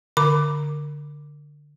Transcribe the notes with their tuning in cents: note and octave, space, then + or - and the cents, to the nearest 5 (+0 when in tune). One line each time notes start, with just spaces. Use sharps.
D3 +0 A#5 +0 D6 +0